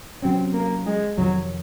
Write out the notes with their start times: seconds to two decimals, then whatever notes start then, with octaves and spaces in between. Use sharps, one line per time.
0.22 C3 F#3 C4 C#4
0.54 A#3
0.86 G#3
1.17 F2 C3 D#3 F#3